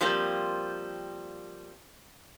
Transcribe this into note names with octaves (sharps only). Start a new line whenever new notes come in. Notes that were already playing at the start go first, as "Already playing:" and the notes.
F3 G3 A#3 C4